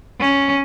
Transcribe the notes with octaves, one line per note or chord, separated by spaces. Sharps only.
C#4